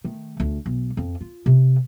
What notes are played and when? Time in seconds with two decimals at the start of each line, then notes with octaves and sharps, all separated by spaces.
0.04 D#3 A3
0.40 D2
0.66 B1
0.97 F2
1.21 F4
1.46 C3